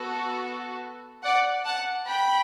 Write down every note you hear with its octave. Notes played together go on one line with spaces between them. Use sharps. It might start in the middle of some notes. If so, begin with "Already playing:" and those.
Already playing: B3 F#4 A4
D5 F#5
F#5 A5
G5 B5